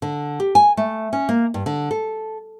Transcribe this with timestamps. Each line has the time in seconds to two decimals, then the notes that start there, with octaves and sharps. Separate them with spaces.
0.02 D3
0.40 G4
0.55 G#5
0.77 A3
1.13 C#4
1.29 A#3
1.54 G2
1.66 D3
1.91 A4